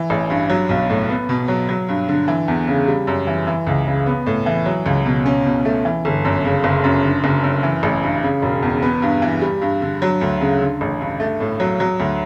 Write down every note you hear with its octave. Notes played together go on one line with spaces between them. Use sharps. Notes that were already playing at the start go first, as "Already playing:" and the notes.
Already playing: E3
A1
G2
F#3
B1
A2
B3
B2
F#3
F#3
G2
D3
E3
E2
C#3
G3
F#2
E3
E3
C#2
C#3
B3
A2
E3
F#3
C#2
B2
C#4
B2
A3
E3
G1
F#2
C#3
F#1
F#2
D3
F#1
F#2
E3
A1
G2
C#3
E1
E2
B3
G2
E3
G3
G2
D3
F#3
D2
C#3
D3
A1
G2
A3
A2
F#3
F#3
D2